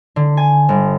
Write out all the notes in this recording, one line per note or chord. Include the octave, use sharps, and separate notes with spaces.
D3
G#5
G1